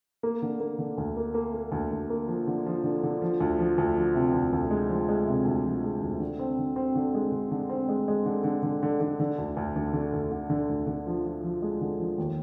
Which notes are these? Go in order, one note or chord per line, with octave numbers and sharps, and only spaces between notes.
A#3
D3
A#3
D3
D2
A#3
A#3
A#3
D2
D2
A#3
F3
D3
F3
D3
D3
F3
D2
F3
D2
F3
C3
D2
D2
G#3
F3
G#3
C3
D2
F3
G#3
D2
D3
C4
D3
C4
D3
G#3
D3
D3
C4
G#3
G#3
D3
D3
D3
D3
D3
D3
D2
D2
D2
D3
D2
D3
D3
D2
D3
F3
F3
F3
G#3
D3
F3
D#2